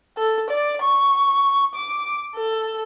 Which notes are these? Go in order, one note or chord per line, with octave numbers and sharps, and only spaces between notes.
A4
D5
C#6
D6
A4